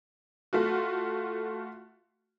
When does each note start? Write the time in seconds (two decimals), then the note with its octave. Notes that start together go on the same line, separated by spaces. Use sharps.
0.53 A3 F4 F#4